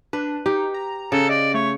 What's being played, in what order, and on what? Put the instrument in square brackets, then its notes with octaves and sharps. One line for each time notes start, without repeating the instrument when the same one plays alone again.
[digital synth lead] D4 [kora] B4
[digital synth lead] D#4 [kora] G4
[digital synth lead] A#5
[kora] C#3 [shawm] A4
[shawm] D5 [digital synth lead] D#5
[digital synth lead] A3 [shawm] C#5